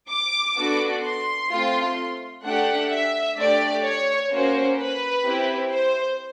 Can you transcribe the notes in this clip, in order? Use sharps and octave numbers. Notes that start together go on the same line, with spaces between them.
D6
B3 D4 F#4 A4
C6
A3 C4 F4
A3 D4 G4 F#5
E5
A3 D4 G4 D5
C#5
A#3 C#4 F#4 C5
B4
C4 E4 G4
C5